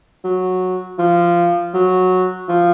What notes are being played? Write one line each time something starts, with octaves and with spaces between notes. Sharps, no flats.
F#3
F3
F#3
F3